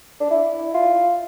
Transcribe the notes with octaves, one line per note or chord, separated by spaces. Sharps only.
D4
E4
F4